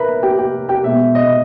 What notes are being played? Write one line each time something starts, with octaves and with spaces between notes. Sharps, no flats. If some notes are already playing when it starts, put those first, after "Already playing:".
Already playing: A#4 B4 E5 A#5 B5
G4 G5
G4 G5
G4 G5
B2 G#3 B3 E5
D#5